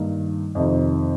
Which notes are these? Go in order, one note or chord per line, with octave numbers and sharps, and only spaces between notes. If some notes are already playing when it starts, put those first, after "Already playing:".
Already playing: G2 D#3 A#3 D#4
F2 C3 D#3